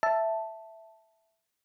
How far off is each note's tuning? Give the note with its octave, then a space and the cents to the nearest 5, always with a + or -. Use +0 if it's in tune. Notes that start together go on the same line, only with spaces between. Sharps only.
E5 +0 A5 +0